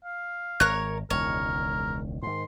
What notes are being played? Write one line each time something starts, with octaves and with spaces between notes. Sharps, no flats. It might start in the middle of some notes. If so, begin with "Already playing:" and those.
F5
G#1 A#4 C#5 F#6
E1 C#2 D#3 A#4 C#5
G#2 D#3 C6